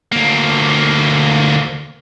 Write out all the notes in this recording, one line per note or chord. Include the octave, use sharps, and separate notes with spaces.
D2 A#3